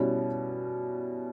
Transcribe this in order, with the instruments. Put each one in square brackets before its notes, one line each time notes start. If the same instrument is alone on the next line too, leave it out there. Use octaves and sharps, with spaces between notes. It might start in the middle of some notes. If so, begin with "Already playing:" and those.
Already playing: [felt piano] B2 G3 C#4 E4